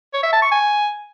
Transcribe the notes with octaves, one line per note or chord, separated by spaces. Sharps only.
C#5
E5
A5
C#6
G#5